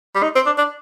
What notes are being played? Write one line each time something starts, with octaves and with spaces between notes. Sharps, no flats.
G3
D#4
C4
D4
D4